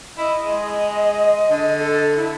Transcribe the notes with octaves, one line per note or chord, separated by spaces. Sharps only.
E4 D#5
G#3
D3
A4
E4